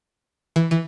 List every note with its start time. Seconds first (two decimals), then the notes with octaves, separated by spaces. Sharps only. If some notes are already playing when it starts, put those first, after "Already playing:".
0.56 E3
0.71 E3